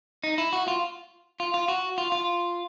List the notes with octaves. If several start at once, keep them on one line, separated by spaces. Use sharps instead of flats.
D#4
E4
F#4
F4
F4
F4
F#4
F4
F4